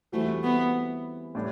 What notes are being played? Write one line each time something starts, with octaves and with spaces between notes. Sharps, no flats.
E3 G3 A3 C4 F#4
B3
A2 G3 D4